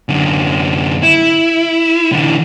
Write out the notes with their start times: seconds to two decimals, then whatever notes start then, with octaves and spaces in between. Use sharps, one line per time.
0.09 F#2 D3
1.03 E4
2.13 D3 E3